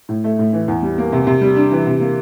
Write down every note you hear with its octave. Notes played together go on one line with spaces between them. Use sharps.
A2
A3
A2
E3
E2
G3
A#3
C3
C3
G3
D4
E3
C3
A#3